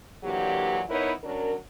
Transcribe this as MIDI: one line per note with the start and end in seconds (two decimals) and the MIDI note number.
0.24 0.82 46
0.24 0.82 50
0.24 0.82 52
0.24 0.82 54
0.24 0.82 58
0.24 0.82 67
0.89 1.12 59
0.89 1.12 63
0.89 1.12 64
0.89 1.12 70
0.89 1.12 71
0.89 1.12 73
1.23 1.54 54
1.23 1.54 61
1.23 1.54 62
1.23 1.54 70